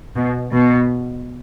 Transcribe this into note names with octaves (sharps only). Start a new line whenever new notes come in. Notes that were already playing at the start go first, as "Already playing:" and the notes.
B2
B2